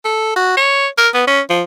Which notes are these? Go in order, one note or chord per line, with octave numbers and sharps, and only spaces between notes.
A4
F#4
C#5
A#4
B3
C#4
F3